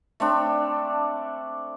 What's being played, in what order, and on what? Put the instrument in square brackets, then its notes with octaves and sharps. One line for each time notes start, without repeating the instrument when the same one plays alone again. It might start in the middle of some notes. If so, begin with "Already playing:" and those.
[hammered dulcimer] A3 C4 D4